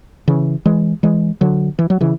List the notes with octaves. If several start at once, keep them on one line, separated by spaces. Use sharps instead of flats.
C#3 E3
E3 G#3
E3 G#3
D3 F#3
E3
F#3
C#3 E3